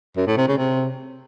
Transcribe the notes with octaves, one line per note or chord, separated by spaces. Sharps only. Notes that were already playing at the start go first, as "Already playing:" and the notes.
F#2
A2
C3
C#3
C3